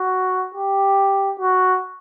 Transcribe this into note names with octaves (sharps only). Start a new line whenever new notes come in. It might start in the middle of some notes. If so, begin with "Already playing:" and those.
Already playing: F#4
G4
F#4